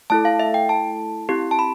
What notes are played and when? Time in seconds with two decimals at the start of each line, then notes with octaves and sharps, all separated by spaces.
0.10 A3 E4 A4 A5
0.25 F5
0.39 E5
0.54 G5
0.69 A5
1.29 C4 E4 G4
1.51 A5
1.59 B5